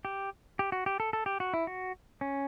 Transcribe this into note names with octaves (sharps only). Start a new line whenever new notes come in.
G4
G4
F#4
G4
A4
A4
G4
F#4
E4
F#4
C#4